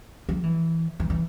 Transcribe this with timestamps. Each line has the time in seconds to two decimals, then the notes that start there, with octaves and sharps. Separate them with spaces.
0.29 F3
0.43 E3
1.00 E3
1.10 E3